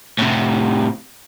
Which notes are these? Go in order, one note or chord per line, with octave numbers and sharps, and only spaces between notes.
A2 C3